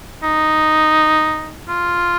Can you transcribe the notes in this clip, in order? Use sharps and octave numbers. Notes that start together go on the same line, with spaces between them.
D#4
F4